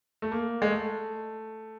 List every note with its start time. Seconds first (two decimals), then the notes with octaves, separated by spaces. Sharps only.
0.22 A3
0.32 A#3
0.62 G#3
0.71 A3